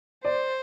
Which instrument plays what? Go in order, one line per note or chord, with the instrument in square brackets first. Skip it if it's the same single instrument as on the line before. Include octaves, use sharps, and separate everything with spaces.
[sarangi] C5 [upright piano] D5